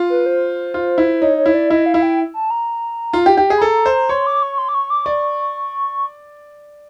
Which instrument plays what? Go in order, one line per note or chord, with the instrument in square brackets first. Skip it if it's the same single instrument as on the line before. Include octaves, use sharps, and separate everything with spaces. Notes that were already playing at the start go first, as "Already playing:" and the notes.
Already playing: [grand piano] F4
[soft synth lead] B4
C5
[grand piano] F4
E4
[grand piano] D#4 [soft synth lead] C#5
[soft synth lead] C#5
[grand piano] E4
[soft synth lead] D5
[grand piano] E4 [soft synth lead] D#5
[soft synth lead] F5
[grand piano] E4
[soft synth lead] G5
A5
A#5
[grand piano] F4
G4
G4
G#4
[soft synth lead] B5
[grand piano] A4 [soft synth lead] A#5
[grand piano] C5
[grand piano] C#5 [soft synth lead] C6
[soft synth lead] D6
C#6
C6
D6
C#6
D6
[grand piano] D5 [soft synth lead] C#6